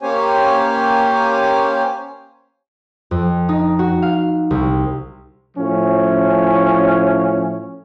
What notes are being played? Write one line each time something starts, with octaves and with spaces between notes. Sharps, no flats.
A#3 C#4 G4 C5 C#5 G#5
F2
D#4
F#4
F5
C2
A2 F3 C#4